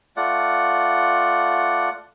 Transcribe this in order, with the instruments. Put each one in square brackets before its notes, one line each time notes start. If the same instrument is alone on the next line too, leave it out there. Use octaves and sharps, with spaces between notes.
[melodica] A3 F4 D5 F#5